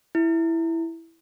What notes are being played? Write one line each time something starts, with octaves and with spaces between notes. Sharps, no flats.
E4